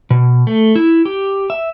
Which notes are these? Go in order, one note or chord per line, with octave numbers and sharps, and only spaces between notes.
B2
A3
E4
G4
E5